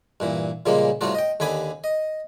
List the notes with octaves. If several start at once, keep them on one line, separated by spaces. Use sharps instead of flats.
G2 A#2 E3
A#2 C#3 F3 G3 G#3 A#3
A2 C3 G3 A3 F4 F#4
D#5 G5
D#2 D3 G4 G#5 B5 D#6
D#5